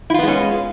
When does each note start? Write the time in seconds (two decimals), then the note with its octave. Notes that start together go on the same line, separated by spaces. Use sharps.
0.10 E4
0.14 F4
0.19 B3
0.23 G#3
0.28 C#4